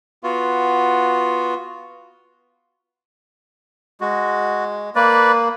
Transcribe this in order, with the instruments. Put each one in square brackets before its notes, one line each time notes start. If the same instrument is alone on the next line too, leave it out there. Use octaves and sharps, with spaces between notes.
[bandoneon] B3 F4 F#4
[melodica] G#3 [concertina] F#4
[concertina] A#3 [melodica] B4 D5